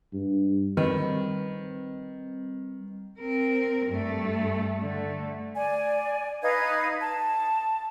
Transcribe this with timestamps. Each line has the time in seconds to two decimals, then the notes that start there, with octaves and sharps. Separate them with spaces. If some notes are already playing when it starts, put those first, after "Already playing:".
0.13 G2
0.77 D#3 G3 C4 B4
3.20 C4 A#4
3.87 G2 A3
4.80 D3 A3
5.55 D5 G#5
6.42 D#4 B4 F5 G#6
7.01 A5